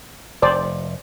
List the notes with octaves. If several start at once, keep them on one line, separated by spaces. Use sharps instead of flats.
F1 C5 D5